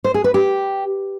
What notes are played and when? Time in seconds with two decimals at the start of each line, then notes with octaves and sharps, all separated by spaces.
0.04 C5
0.14 G#4
0.24 B4
0.34 G4